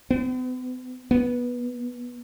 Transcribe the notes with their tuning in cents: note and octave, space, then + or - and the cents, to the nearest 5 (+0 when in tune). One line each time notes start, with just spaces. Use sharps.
B3 +45
B3 -15